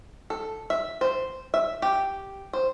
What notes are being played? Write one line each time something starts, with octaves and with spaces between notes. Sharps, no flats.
A4
E5
C5
E5
G4
C5